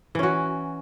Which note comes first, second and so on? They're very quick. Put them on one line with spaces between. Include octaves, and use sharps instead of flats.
E3 C#4 F#4